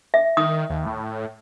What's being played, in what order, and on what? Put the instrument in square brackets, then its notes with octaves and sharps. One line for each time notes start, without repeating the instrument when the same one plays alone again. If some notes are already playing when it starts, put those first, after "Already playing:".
[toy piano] E5
[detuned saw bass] D#3 [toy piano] D#6
[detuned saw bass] D#2
A2